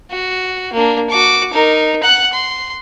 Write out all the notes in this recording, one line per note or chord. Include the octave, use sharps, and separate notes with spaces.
F#4
A#3 D4
F#4 D6
D#4 A#4
F#5 F#6
C6